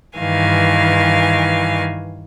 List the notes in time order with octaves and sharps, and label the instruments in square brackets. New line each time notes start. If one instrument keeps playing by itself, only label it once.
[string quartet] G2 D#3 E3 F5 G#5